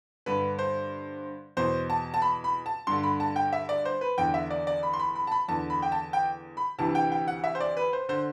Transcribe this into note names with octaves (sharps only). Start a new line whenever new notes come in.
G2 D3 B4
C5
E2 B2 C5
A5
A5
B5
B5
A5
G2 D3 C6
B5
A5
G5
E5
D5
C5
B4
E2 D3 G5
E5
D5
D5
B5
C6
B5
B5
A5
B5
E2 D3 A5
B5
G5
A5
G5
B5
D2 C3 E3 A5
G5
G5
F#5
E5
C5
D5
B4
C5
D3 C5